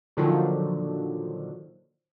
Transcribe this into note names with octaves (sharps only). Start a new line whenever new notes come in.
A#2 D3 D#3 F3 F#3